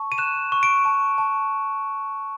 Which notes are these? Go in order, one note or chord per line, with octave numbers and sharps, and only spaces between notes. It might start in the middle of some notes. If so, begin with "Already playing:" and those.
Already playing: A5 C#6
D#7
F#6 E7
C#6
D7
A5
A5